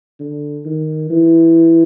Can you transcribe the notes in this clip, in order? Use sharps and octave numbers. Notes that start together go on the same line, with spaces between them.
D3
D#3
E3